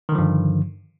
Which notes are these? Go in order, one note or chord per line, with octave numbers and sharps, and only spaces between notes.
G2 D3 D#3 F3